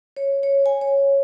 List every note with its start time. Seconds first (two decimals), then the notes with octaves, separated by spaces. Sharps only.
0.17 C#5
0.43 C#5
0.66 G#5
0.81 C#5